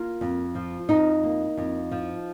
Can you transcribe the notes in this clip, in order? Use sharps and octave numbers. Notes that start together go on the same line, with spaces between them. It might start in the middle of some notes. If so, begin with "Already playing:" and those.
Already playing: A#3 F4
F2
F3
F2 D#4
A#3
F2
F3